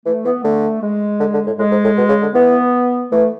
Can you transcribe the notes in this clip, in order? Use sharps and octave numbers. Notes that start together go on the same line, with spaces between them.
E3 A3
E3 B3
D3 A3
G#3
D3
D3
A2
A2 G#3
G#2
A2
B2
C#3
D3
E3 B3
E3 A3